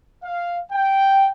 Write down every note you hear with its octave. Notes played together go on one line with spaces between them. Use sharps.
F5
G5